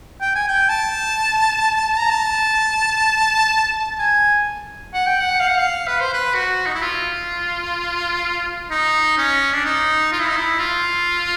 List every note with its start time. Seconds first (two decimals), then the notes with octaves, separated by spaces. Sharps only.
0.21 G5
0.35 G#5
0.48 G5
0.69 A5
1.99 A#5
2.10 A5
3.99 G#5
4.93 F#5
5.06 G5
5.20 F#5
5.40 F5
5.49 F#5
5.57 F5
5.87 B4
6.00 C5
6.13 B4
6.34 F#4
6.67 D#4
6.74 E4
6.82 F4
8.71 D#4
9.18 C#4
9.54 D4
9.65 D#4
10.12 F4
10.20 E4
10.28 D#4
10.37 E4
10.59 F4